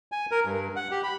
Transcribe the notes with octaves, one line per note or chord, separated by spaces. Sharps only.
G#5
A#4
G2
F#5
G4
B5